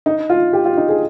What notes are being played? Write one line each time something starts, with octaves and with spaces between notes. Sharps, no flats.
D#4
F4
G4
F4
D#4
G#4